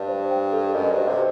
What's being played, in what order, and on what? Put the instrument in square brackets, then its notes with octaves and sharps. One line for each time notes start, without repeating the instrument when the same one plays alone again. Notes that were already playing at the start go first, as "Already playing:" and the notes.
Already playing: [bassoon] G2 [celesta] A5
[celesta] C5
G5
A4
[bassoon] F#2 [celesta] D#5
[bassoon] G2
[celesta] C5
[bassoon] C3